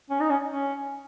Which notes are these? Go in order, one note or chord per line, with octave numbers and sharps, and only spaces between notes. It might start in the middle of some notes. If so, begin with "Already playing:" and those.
C#4
D#4
C#4
C#4